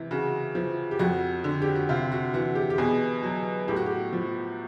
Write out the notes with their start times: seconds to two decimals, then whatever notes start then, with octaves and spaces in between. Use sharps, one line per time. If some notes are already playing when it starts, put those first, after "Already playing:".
Already playing: C3 E3
0.11 C#3 F#4
0.55 F3
0.91 G4
0.99 F2 F#4
1.44 D3
1.62 G4
1.75 F#4
1.89 C3 F4
2.12 F#4
2.34 E3 F#4
2.55 G4
2.70 G4
2.78 B2 G#4
3.23 F#3
3.68 A2 G4
3.76 F#4
3.86 G4
4.13 F3